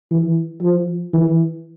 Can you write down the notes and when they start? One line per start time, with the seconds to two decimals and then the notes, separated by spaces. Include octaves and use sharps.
0.11 E3
0.62 F3
1.13 E3